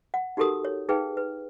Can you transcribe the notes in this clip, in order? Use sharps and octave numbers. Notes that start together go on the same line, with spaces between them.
F#5
D#4 F#4 G4 A4 A#4 D#6
C#5
D#4 G#4 B4 F5 G5
B4